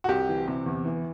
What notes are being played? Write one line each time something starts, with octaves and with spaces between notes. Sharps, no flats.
F#4
C2 G4
E3
C3
E2
E3